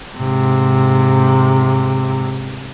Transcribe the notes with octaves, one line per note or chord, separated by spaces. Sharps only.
G#2 C3